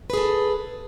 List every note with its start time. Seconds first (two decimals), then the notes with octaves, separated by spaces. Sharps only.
0.10 B4
0.13 G#4
0.17 A4